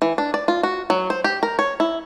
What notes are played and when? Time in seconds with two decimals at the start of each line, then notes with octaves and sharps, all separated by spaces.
0.02 E3
0.18 D4
0.34 D5
0.48 F4
0.63 F#4
0.90 F#3
1.10 C5
1.24 G4
1.43 A#4
1.59 C#5
1.80 E4